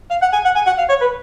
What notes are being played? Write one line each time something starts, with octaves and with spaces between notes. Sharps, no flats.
F5
F#5
G#5
F#5
G#5
F#5
F5
C#5
B4